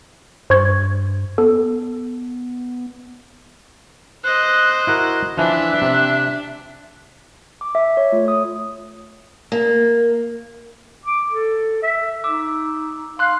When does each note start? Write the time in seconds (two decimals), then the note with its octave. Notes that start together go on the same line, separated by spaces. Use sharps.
0.50 G2 C5 C#6 G#6
1.38 B3 A4
4.24 C5 D#5 F#6
4.87 E4 F#4 A#4
5.37 E3 F3 D4 E5 F#6
5.82 C3
7.61 D6
7.75 E5
7.97 C#5
8.12 A3 F4
8.26 C#5 D#6
9.52 A#3
11.05 D6
11.30 A4
11.83 E5
12.24 D#4 D6 E6
13.19 F5 C6 F#6